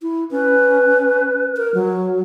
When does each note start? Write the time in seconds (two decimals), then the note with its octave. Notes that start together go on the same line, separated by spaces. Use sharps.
0.02 E4
0.31 C#4 B4
1.57 A#4
1.74 F#3